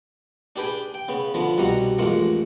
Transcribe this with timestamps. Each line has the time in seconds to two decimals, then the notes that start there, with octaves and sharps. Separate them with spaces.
0.56 D4 G4 G#4 B4 G5 G#5
0.94 G5
1.08 C#3 B3
1.34 D3 F3 B3
1.58 C2 B2 G3 F#5 A#5
1.99 A1 F2 G#3 A#3 F#5